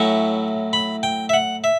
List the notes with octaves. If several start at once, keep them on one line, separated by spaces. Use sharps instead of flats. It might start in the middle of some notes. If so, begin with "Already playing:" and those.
Already playing: A2 F#3 C#4 E4 C#6
B5
G5
E5
F#5
E5